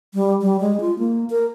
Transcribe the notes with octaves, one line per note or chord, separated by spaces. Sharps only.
G3
G3
G#3
F4
A#3
A#4